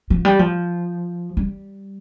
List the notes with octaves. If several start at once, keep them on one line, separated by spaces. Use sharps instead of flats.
F3
G3
F3
G3